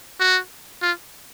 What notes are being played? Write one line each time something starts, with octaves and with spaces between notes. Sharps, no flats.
F#4
F4